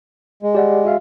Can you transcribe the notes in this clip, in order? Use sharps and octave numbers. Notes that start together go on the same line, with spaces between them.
G#3
G4 D5 F#5
F#4 E5 F5